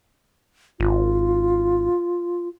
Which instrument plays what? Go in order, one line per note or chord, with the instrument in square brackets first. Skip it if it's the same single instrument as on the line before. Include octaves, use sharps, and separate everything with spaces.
[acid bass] G#1 [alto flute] F4